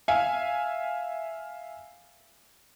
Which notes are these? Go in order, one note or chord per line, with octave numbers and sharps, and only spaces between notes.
E5 F5 G#5